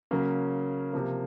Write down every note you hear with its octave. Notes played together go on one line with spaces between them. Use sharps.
C#3 F#3 A#3 C#4
C3 F3 A#3